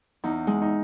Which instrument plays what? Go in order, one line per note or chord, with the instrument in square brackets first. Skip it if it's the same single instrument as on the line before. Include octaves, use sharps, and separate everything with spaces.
[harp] E2 [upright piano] D#4
[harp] G#3
[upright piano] D#4